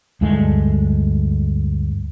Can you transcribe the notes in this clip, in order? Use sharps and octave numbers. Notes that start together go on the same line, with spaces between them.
D2 G2 G#3 A3